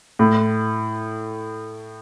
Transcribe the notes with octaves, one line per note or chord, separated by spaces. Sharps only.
A2